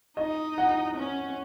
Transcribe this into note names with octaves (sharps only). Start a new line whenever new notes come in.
D#4 D#5
F#5
C#4